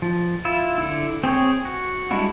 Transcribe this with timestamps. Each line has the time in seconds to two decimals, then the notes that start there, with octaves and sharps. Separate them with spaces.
0.02 F3
0.45 E4 F4 E5
0.78 D3 E4
1.24 C4 G#4 C#5 G5
1.65 F#4
2.11 G3 G#3 D4 E4 F#4